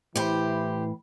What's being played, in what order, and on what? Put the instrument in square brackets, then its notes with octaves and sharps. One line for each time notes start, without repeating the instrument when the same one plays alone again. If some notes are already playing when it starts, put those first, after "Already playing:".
[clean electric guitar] A2 G5 B5 [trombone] E3 [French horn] E4 [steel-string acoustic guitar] G4 C5